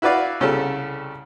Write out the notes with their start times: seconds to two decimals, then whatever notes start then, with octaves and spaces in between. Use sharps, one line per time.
0.02 E4 F#4 B4 D5 F5
0.40 C2 C#3 G3 C#4 A4